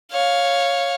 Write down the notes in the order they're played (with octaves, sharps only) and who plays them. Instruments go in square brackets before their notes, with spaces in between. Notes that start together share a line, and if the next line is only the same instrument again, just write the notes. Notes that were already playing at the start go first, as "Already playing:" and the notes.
[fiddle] C#5 F5